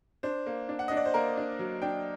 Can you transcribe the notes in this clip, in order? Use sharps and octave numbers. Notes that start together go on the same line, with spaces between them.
D4 C5
A#3
D4
F#5
D4 D#5
D5
C5
A#3 A#4
D4
F#3
D4 G5